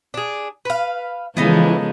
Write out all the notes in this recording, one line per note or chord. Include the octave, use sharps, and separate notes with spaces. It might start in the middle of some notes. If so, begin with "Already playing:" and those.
D4 G#4
B4 F5
C#3 E3 F3 G#3 B3 D#4 A4